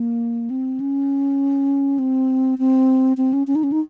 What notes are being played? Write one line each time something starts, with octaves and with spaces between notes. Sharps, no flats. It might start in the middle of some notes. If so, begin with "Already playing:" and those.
Already playing: A#3
C4
C#4
C4
C4
C4
C#4
C#4
D#4
C#4
D#4